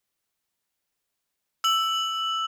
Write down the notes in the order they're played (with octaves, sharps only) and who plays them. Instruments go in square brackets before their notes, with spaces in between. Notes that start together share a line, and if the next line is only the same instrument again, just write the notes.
[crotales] E6 F#7